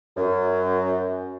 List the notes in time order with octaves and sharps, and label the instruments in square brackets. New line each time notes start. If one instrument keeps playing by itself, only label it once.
[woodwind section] F#2